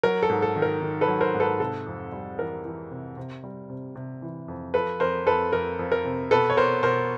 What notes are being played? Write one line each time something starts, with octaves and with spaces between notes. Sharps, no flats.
F#3 A#4
A4
G#2
A4
D#3
A#4
D#3
A4 B4
F#3
A#4 C5
G#2
A4 B4
C3 A4
F2
G3
E3 A#4
E3
C3
C3
G3
C3
C3
E3
F2
F3 A4 B4
F2 A#4 C5
F2 A4 B4
F2 A#4
F2
A#4
C3
B2 A4 B4
C#5
B2 A#4 C5
B2 A#4 C5